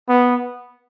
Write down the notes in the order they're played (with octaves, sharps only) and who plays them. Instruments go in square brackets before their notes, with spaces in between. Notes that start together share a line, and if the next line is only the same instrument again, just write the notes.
[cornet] B3